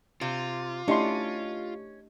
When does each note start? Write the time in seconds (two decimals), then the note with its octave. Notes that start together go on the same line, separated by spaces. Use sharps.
0.21 C3 F4
0.88 A3 C#4 D4 E4 G4 D#5 C6